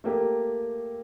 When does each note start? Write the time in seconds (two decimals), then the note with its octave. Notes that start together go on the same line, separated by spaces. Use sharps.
0.04 A3 A#3 G4